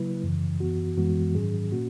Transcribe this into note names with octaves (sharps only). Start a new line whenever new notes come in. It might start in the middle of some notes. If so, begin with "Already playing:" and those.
Already playing: C#3 F#3 A#3 E4 B4
F#2 C#3 E3
F#2 E3 B3 F#4
F#2 E3 G#3 B3 F#4
G#2 D#3 F#3 C#4 G#4
A#2 A#3 C#4 F#4